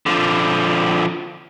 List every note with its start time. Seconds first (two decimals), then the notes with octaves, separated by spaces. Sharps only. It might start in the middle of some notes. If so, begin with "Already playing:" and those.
0.06 D3 F3